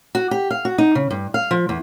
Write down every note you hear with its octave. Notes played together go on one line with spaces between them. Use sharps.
F#4
G4
F5
F#4
D#4
C#3
G2
F5
F3
E2